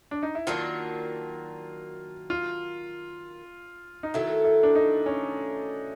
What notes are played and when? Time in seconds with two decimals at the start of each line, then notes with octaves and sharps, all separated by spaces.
0.11 D4
0.23 D#4
0.35 E4
0.47 D#3 F#3 A#3 D4 F4
2.30 F4
4.03 D#4
4.14 D#3 F#3 A3 E4
4.44 E4
4.63 D4
4.75 D#4
5.06 C#4